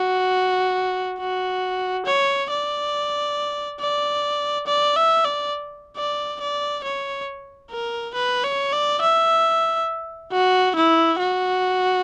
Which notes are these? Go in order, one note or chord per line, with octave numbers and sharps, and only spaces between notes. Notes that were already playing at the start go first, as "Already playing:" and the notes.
Already playing: F#4
F#4
C#5
D5
D5
D5
E5
D5
D5
D5
C#5
A#4
B4
C#5
D5
E5
F#4
E4
F#4